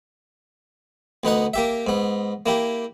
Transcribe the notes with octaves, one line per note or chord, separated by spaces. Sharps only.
D2 B3 D#4 F#5
A#3 G4 E5
G#2 B3
A#3 E4 G4